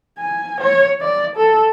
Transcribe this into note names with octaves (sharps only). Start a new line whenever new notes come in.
G#5
C#5
D5
A4